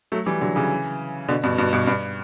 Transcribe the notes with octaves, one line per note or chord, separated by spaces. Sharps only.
F#3 A3
E3 G3
D3 F#3
C#3 E3
B2 D3
G2 B2
G2 B2
G2 B2
G2